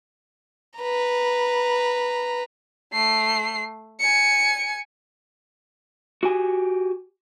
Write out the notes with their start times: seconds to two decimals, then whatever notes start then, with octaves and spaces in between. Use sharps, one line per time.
0.79 B4 A#5
2.93 A3 C7
4.00 G#5 C#7
6.23 F#4 G4 G#5